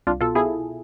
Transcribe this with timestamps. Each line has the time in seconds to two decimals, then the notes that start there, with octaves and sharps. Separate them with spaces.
0.07 C2 D4 F4
0.21 B2 F4 A4
0.35 B2 E4 G#4